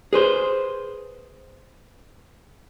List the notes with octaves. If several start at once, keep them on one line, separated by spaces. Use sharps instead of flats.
G#4 B4 C5